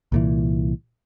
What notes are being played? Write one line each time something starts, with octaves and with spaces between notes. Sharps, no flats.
C2 A#2 E3